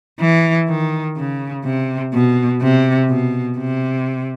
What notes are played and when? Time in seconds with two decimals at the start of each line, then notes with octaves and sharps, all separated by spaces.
0.20 E3
0.69 D#3
1.17 C#3
1.65 C3
2.13 B2
2.62 C3
3.10 B2
3.58 C3